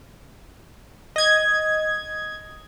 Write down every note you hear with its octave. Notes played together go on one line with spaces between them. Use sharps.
D#5 G#6